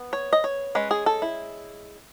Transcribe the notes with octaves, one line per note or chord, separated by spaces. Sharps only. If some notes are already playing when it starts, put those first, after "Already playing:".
Already playing: B3
C#5
D#5
C#5
G#3 C#4 B4
G#4
A4
E4